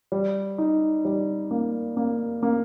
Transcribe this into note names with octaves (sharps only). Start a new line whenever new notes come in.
G3
D#4
G3
A#3
A#3
A#3